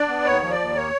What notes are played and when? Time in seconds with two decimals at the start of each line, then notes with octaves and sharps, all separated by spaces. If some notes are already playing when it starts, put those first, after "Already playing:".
Already playing: D4 D5
0.08 B3
0.25 D#2 C#5
0.42 F3
0.51 D5
0.59 D#2
0.76 A#3 C#5